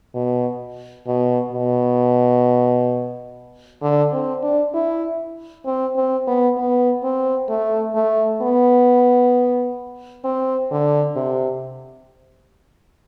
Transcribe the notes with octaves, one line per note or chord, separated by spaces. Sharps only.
B2
B2
B2
D3
C4
D4
E4
C4
C4
B3
B3
C4
A3
A3
B3
C4
D3
C3